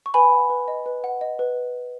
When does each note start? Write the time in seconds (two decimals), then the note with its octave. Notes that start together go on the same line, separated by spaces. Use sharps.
0.06 C#6
0.14 B4 G#5 B5
0.32 F#5
0.50 B4
0.68 D#5
0.86 B4
1.04 F#5
1.21 D#5
1.39 B4